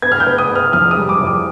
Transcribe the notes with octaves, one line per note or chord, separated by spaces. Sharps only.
B3 G#6
F6
G6
B3
D#6
B3
F6
F2 F6
D#6
G3
D6
F2
D6